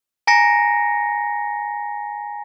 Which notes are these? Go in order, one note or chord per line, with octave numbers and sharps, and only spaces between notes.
G#5 A#5 A#6 C#7